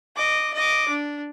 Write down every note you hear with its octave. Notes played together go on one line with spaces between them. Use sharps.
D#5 D6
D#5 D6
D4